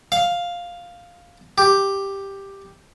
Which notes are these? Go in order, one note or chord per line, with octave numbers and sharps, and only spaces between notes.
F5
G4